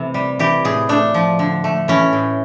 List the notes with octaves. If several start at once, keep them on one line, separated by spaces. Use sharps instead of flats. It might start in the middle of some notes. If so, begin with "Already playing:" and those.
Already playing: C3 E3 A3
G3
E3 G4
A2 G#4
A3 D4
F3
D3
A3
E3 C#4
A2